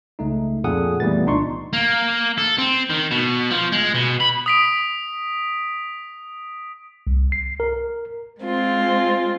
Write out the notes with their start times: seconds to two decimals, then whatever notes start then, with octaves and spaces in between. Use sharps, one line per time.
0.19 C#2 A3 D#4
0.64 F2 A#2 G#4 A4 F#5 D#6
1.00 A#2 E3 G3 A3 B3 A6
1.26 C2 D4 D#4 C6 C#6
1.73 A#3
2.38 A4
2.58 C4
2.90 D#3
3.11 B2
3.50 F3
3.72 G#3
3.95 B2
4.20 B5
4.46 D#6 B6 D7
7.07 C2
7.32 C7
7.60 A#4
8.41 G#3 C4 F4